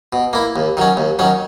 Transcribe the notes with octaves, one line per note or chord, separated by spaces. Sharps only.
B2
A#3 E4
D#2
D#3 F#3 C#4
D#2
D#3 F#3 C#4